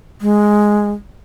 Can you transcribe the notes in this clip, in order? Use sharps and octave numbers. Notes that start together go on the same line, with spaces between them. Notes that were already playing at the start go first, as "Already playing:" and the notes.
G#3